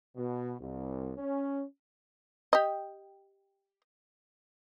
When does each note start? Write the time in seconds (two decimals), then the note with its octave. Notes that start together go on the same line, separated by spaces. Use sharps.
0.16 B2
0.59 C2
1.18 C#4
2.53 G4 D#5